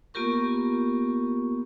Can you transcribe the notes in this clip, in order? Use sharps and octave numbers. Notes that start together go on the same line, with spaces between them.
A#3 B3 F4 G4 A#4 C#6